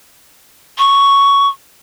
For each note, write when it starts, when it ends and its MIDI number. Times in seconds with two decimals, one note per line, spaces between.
0.78 1.48 85